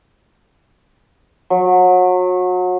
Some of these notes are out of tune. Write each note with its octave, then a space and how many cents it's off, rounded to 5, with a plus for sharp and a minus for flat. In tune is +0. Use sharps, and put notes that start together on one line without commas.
F#3 -30